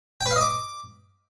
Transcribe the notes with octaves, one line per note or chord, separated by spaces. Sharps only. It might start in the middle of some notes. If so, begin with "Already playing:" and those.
G5
B4
F5
D#5
D6